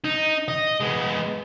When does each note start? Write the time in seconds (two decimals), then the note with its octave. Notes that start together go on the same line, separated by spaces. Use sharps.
0.05 D#4
0.48 D#5
0.81 G#3 B3